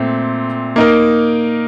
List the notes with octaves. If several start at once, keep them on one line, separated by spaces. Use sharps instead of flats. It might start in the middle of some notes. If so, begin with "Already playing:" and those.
Already playing: A#2 A3 C4
A#3 D#4 A#4